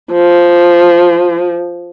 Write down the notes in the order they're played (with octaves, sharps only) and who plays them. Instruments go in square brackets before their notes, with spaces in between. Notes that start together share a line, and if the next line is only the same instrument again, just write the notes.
[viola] F3